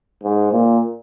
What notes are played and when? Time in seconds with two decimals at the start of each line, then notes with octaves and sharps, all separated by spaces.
0.23 G#2
0.52 A#2